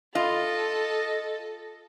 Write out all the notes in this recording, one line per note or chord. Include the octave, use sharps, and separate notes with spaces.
F4 A4 D#5